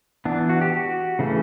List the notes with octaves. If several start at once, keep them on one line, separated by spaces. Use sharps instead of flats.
E3 B3 D4
F#4
G4
F#4
C#3 E3 A3 C#4